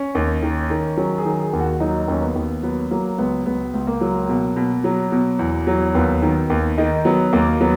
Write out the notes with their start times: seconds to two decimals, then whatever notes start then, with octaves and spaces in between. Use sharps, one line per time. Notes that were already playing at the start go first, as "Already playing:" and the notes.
Already playing: C#4
0.15 D#2
0.42 D#3
0.70 D#3
0.97 F#3 C#4
1.18 G#4
1.25 D#3
1.39 G#4
1.53 D#2
1.59 F#4
1.80 F#3 D#4
2.08 D#2 C#4
2.22 B3
2.35 D#2
2.63 F#3 B3
2.91 F#3 A#3
3.18 C#2 B3
3.46 C#2 B3
3.73 C#2
3.87 A#3
4.01 F#3
4.29 B2
4.56 B2
4.84 F#3
5.12 B2
5.39 E2
5.67 F#3
5.94 D#2 B3
6.22 D#3
6.50 D#2
6.78 D#3 D#4
7.05 F#3 B3
7.33 D#2 A#3
7.61 F#3 B3